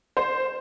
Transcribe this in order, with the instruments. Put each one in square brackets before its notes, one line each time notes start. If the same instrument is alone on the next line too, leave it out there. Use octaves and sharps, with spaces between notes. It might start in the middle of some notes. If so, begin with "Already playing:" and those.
[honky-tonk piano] C5